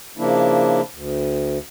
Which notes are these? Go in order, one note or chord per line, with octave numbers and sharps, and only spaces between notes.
C#3 F3 A#3 D4 E4
D2